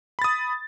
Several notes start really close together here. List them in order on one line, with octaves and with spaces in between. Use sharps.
B5 A6 D#6